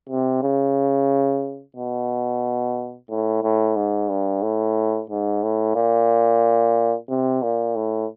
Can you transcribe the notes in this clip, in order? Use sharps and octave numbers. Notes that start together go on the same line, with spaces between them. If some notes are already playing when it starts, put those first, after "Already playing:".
C3
C#3
B2
A2
A2
G#2
G2
A2
G#2
A2
A#2
C3
A#2
A2